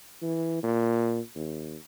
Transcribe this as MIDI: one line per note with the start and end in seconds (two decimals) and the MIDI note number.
0.22 0.62 52
0.63 1.20 46
1.35 1.76 39